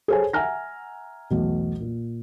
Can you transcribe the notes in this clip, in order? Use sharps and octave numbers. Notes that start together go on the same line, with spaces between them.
G#4 A4 C5 C#5 G#5
E5 F#5 G#5 A#5 F6 A#6
B1 E2 A3
A#2